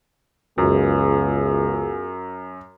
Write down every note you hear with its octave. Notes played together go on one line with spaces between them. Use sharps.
C#2 F#2 B3 F4 G#4